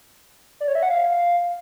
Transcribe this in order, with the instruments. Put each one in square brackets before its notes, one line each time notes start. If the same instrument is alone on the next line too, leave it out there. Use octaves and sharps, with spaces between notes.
[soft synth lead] D5
C#5
E5
F#5
F5